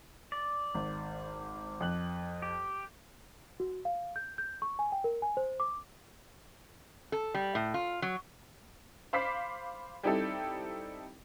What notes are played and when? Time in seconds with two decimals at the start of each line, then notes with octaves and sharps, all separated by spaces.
0.32 D5
0.75 G#1
1.80 F2 F#6 F#7
2.42 G4
3.60 F#4
3.85 F5
4.16 G6
4.38 G6
4.62 C#6
4.79 G#5
4.92 G5
5.04 A#4
5.22 G#5
5.37 C5
5.60 D6
7.12 A4
7.34 G3
7.55 A2
7.74 F4
8.02 F#3
9.13 C5 F5 B5 D6 B6 C7
10.03 G3 C4 D#4 E4 G4 A4